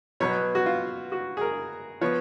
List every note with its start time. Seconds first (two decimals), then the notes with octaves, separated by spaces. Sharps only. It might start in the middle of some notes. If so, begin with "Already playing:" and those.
0.20 B2 F#3 B3 C#5
0.55 F#4
0.66 F4
1.12 F#4
1.37 G#4
1.41 A#4
2.01 F3 B3 C#5